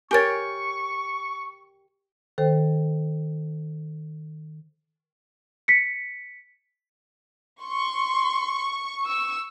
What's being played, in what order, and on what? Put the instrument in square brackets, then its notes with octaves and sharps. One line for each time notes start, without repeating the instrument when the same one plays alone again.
[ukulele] G4 A#4 C#5 [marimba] G#5 A6 [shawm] C#6
[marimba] D#3 A4 C5 G5
[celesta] B6 C#7
[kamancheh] C6 [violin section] C#6
[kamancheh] E6